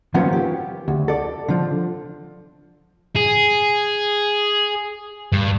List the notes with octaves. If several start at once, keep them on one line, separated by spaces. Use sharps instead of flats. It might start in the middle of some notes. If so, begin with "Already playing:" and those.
D#3 F3 F#3 A#3 B3 C#4
G4
D2
A4 D5
D3 F3
G#4
G2